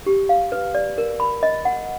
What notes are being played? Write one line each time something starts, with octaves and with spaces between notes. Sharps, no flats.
G4
F5
B4
D5
A#4
B5
D#5
F#5